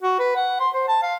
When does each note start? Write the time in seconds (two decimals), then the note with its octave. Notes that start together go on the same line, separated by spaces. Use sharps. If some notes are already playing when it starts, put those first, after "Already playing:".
0.03 F#4
0.19 B4
0.36 F#5
0.60 C6
0.74 C5
0.88 A5
1.03 F5